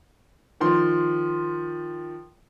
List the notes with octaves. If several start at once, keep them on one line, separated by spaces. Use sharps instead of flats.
D#3 F3 C6